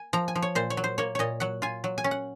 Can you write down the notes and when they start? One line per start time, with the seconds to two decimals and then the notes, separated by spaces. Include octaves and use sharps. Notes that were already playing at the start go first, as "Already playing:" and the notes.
Already playing: G#5
0.13 F3 A#5
0.28 G#5
0.35 F3
0.42 C#5
0.55 A#2 C5
0.70 C#5
0.77 F#3
0.84 C5
0.98 A#3 C#5
1.15 A#2 C#5 D#5
1.40 F#3 F#5
1.62 F4 G#5
1.84 F#3
1.98 G#5
2.04 C#4
2.11 F#5